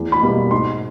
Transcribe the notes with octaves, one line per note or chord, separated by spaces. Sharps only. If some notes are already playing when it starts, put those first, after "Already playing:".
Already playing: E2
B5
B2 G3 A#3
G#2 C6